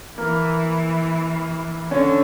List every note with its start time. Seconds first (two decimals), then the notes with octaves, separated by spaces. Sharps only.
0.17 E3 A#3 A#4
1.91 D3 C#4 C#5